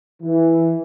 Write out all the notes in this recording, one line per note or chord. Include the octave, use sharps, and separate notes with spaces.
E3